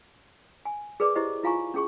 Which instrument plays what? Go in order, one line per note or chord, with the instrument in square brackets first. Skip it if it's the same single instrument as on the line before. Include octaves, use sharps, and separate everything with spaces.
[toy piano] G#5
G#4 A#4 B4 D5 D6
E4 G4 C5 D#5
E4 F4 F5 G#5 A#5 C#6
C#4 G#4 C#6